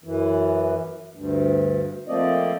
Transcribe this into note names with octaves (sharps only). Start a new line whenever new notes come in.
F#2 E3
D2 G2
F3 A3 A#3 C4 D5 D#5